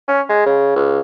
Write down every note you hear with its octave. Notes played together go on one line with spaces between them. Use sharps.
C#4
G#3
C#3
C#2